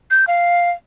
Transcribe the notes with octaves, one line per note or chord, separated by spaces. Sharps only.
G6
F5